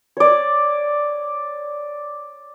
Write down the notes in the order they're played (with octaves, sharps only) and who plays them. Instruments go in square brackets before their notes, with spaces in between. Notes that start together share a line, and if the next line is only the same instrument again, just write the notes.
[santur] C#5 D5